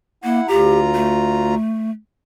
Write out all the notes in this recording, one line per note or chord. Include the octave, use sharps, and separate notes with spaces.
A#3 E4 F#5
D2 F4 G4 A#5
A3